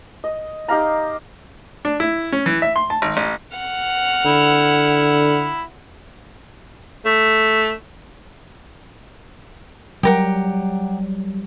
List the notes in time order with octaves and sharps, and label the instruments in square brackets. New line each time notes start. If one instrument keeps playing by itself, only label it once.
[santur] D#5
D#4 G4 F5 A#5
[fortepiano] D4
E4
C#4
E3
E5
C6
A5
G#1
A1
[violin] F#5 F6
[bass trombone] D3 [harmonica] E4
[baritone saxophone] A3
[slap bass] F#3 G3 [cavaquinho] G4 A#4 F#5